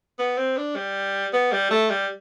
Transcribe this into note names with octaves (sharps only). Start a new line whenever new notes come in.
B3
C4
D4
G3
B3
G3
A3
G3